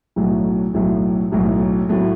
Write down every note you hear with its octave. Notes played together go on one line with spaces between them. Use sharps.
B1 A2 F#3 A3
B1 A2 F#3 A3
B1 A2 F#3 A3
A2 F#3 A3